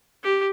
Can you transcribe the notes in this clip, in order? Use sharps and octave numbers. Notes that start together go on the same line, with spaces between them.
G4